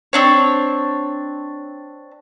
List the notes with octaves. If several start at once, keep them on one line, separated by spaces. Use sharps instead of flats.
C4 D4 C#5